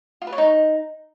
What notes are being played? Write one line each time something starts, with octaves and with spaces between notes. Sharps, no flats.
F4
B4
C#5
D#4